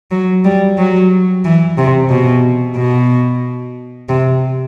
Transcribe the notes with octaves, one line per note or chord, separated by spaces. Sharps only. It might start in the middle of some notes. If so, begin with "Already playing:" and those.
F#3
G3
F#3
E3
C3
B2
B2
C3